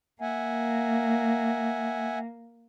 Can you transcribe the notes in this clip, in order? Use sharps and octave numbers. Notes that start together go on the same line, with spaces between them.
A#3 E5 F#5 G#5